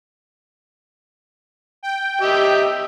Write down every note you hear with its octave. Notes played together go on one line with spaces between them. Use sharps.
G5
G4 D#5 E5